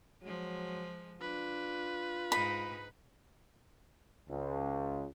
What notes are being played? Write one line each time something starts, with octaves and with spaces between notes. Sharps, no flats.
F3 F#3 G#3
D4 F4 B4
G#2 D#4 B5
C#2